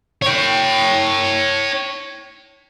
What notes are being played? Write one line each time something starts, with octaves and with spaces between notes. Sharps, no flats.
C#5 G5